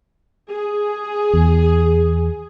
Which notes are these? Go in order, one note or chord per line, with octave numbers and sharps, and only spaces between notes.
G#4
E2